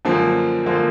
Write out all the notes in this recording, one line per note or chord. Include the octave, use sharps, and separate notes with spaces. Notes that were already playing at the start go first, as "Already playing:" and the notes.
F#2 D3 F3 A#3
D3 F3 A#3